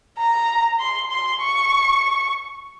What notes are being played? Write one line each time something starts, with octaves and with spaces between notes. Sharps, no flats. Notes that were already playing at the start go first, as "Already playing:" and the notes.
A#5
C6
C6
C#6